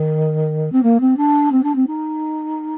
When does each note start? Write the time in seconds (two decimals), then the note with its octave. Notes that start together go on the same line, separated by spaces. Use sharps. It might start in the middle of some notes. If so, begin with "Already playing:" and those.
Already playing: D#3
0.72 C4
0.82 A#3
1.00 C4
1.16 D4
1.51 C4
1.63 D4
1.75 C4
1.87 D#4